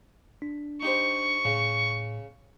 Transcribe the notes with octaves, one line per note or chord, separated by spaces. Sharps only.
D4
D#4 G4 C5 C#6
A2 C#3